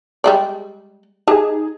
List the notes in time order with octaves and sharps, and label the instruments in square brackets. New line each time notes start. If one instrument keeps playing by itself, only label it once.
[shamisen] G3 G#3 D5
[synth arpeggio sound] D#4 G#4 [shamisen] G4 A5